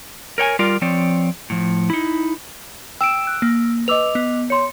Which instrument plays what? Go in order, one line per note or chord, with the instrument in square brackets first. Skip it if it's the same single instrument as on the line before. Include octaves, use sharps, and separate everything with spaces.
[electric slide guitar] A#4 C#5 G5 G#5
G3 F4 A#4 D5
F3 C4 C#5 D5
A2 F3
D#4 E4
[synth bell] G5 E7 [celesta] E6 D7
[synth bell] F#6
A#3
[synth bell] B4 E6 [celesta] D#5 D6 F7
[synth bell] B3
[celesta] C#5 C6 [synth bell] C#7